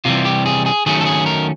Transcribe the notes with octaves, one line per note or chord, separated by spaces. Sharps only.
C3 E3 G3 F4
G4
G#4
G#4
D#3 F#3 A3 C#4 G#4
A4
G#4
A#4